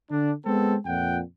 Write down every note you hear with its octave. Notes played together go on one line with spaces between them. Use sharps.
D3 D4
G#3 B3 C4 A4
F2 A#2 F#5 G5